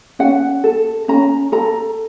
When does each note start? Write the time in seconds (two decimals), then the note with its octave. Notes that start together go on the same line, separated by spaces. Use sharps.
0.19 C#4 F#5
0.64 A4
1.08 C#4 A#5
1.52 A4 A#5